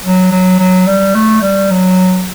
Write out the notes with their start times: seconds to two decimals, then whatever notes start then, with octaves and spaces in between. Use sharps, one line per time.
0.04 F#3
0.32 F#3
0.59 F#3
0.87 G3
1.15 A3
1.42 G3
1.71 F#3